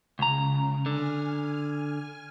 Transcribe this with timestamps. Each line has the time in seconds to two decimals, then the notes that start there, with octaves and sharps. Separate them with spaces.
0.19 C#2 C#3 A#5
0.86 D3 G#5 F6